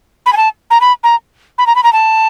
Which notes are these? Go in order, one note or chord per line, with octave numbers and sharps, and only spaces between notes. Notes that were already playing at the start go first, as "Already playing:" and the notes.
B5
G#5
A5
A#5
B5
A#5
B5
A#5
B5
A#5
A5